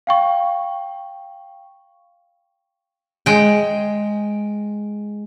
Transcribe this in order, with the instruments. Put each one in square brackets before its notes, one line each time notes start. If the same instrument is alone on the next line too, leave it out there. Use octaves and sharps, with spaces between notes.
[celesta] F5 G5 C#6
[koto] G#3 G5